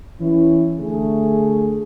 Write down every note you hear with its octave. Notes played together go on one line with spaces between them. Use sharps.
E3 C#4 E4
D3 A3 G#4